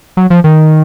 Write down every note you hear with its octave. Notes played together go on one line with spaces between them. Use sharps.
F#3
F3
D#3